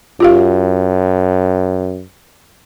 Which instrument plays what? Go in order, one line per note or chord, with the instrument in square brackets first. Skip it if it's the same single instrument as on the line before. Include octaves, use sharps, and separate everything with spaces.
[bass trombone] F#2 [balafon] F4 G4 F5